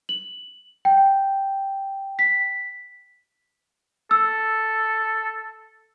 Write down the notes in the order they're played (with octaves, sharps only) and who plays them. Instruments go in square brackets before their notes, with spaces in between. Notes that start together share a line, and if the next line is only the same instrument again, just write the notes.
[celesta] F#7
G5
B6
[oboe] A4 [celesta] E6